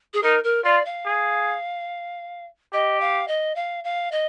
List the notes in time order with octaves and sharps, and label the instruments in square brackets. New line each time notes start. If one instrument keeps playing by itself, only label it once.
[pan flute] G#4
[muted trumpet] D#4 [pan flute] A#4
[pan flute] A#4
[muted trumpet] F4 [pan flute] D5
[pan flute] F5
[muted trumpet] G#4
[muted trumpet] G4 [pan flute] D#5
[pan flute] F5
D#5
F5
F5
D#5